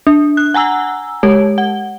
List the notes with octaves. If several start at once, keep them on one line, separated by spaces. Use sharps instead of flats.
D4
F#6
F#5 G#5 A#5 E6
G#3 G4 C#5
F#5